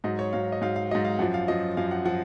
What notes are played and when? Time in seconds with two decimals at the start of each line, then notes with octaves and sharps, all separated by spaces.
0.04 G#2 F#3 D#5
0.19 C#5
0.33 G#2 F#3 F5
0.52 D#5
0.61 G#2 F#3 F5
0.76 F5
0.91 G#2 F#3 D#5
1.05 F5
1.19 F#2 F3 F#5
1.34 F5
1.48 F#2 F3 D#5
1.77 F#2 F3 F5
1.91 F#5
2.05 F3 F#5